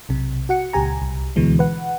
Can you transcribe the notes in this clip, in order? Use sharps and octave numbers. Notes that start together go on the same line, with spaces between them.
B1 C3
F#4 F#5 C#7
C#2 A#2 G4 G#5 A#5
C2
D2 B2 D3 E3 G#3
B4 F#5